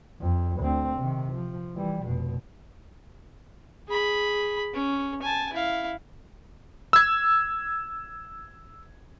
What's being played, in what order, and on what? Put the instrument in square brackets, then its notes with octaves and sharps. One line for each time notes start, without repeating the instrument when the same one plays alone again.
[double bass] F2
D2 C4
C3 D#3
F3
E3 G3
F1 B2
[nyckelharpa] G#4 B5
C#4
G#5 A5
E4 F5
[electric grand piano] E6 G#6